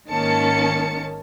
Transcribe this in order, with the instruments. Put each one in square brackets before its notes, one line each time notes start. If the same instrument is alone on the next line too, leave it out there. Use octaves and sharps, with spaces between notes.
[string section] G#1 D#3 A#3 C#4 A5 C#7